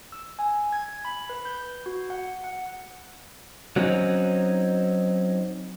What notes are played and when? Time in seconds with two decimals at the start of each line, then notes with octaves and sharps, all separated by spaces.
0.12 E6
0.39 G#5
0.73 G#6
1.05 B5
1.29 B4
1.45 G6
1.86 F#4
2.10 F#5
2.44 F#5
3.76 F#3 C4 C#4 D#4